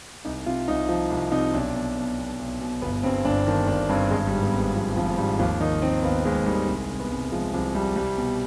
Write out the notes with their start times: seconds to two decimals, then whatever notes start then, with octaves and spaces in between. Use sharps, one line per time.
0.25 C2 D#4
0.46 C3 F4
0.68 C2 D#4
0.89 F3
1.11 C2
1.32 C3 D#4
1.53 B1 D4
1.75 B2
1.97 B2
2.18 B1
2.39 B1
2.61 B2
2.82 G1 B3
3.03 G2 C4
3.25 G1 D4
3.46 D#3 D4
3.68 G1 D4
3.89 G2 C4
4.11 G#1 G#3
4.27 G3
4.32 G#2
4.43 B3
4.53 G#1
4.59 G#3
4.75 F3
4.91 G3
4.96 G#1 F3
5.18 G#2 G3
5.39 D#2 F3
5.61 D#3 D#4
5.82 D#3 C4
6.03 D#2 B3
6.25 D#2 G#3
6.46 D#3 G3
6.68 C2 G#3
6.89 C3
7.00 B3
7.11 C2
7.32 F3 G#3
7.53 C2 F3
7.75 C3 G3
7.96 C2 G3
8.18 B2